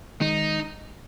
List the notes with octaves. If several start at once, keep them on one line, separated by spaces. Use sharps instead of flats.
D#3 G#3 D#4